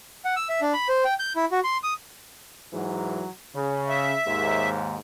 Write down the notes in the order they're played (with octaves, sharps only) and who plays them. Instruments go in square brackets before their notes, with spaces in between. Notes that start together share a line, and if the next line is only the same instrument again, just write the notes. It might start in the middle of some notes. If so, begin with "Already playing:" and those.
[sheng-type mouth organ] F#5
E6
E5
D4
B5
C5
G5
G6
E4
F#4
C6
D#6
[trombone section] G#2 E3 F#3
C#3
[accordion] E5
[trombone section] D#2 G#2